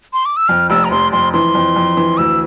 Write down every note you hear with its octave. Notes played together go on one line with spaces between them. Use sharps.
C6
D6
E6
F2 F6
F1 E6
A#5
F1 C6
F2 C6
E3 C6
F2
F2
E3
D2 E6